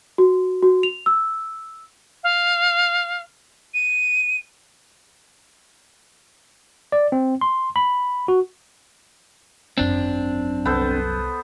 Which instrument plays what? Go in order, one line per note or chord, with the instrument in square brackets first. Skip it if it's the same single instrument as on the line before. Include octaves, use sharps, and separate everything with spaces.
[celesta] F#4
F#4
F7
E6
[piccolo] F5
D#7
[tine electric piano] D5
C4
C6
B5
F#4
[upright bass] G#1 F#2 [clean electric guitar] C4 D4
[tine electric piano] C2 [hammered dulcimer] B3 A4 C5